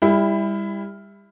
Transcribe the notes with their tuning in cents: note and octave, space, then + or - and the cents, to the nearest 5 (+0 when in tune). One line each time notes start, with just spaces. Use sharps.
G3 +30 E4 +0